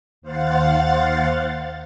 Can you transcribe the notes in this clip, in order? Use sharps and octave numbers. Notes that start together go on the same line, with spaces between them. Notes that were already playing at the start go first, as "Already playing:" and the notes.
D#2 C5 F5 F#5 A6